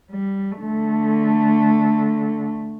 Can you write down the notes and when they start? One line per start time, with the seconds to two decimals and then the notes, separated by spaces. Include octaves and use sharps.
0.11 G3
0.60 D3 A3